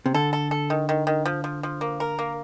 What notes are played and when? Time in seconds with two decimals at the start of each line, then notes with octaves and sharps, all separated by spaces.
0.06 C3
0.14 D3 A4
0.33 A4
0.51 A4
0.70 D#3
0.89 D#3
1.07 D#3
1.25 F3
1.44 F3
1.63 F3
1.81 A#3
2.00 A#4
2.19 A#3